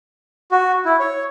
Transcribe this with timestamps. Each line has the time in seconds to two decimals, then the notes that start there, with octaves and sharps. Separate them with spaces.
0.52 F#4
0.85 E4
1.00 C#5